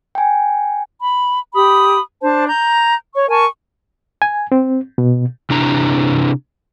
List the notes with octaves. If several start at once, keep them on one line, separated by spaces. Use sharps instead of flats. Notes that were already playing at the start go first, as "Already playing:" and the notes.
G5 G#5
B5
G4 B5 D#6
D4 C5 A5
A#5 G6
C#5 C#6
A#4 G#5 A5 C#6
G#5
C4
B2
C3 D4 E4 A#5